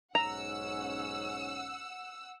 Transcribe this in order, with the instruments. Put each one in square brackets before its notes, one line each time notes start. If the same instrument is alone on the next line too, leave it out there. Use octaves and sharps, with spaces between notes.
[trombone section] B1 G#2 C#4 [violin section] F#5 E6 [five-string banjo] A#5